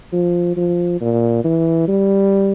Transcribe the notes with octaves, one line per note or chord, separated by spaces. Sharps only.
F3
F3
A#2
E3
G3